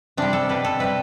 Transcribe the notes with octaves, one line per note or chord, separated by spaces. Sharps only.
C3 G3 D4
A4
B2 G3 B4
A4
C3 G3 B4